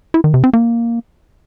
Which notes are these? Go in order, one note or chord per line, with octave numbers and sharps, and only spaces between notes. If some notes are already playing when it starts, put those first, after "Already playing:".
E4
D#3
C3
C4
A#3